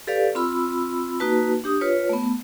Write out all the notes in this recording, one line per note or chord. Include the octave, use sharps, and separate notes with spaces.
G4 A4 B4 D5 F5
C4 F4 B5 E6
A#3 D#4 F#4 B4 A5
D4 G4 D#6
F4 B4 C#5
A3 B3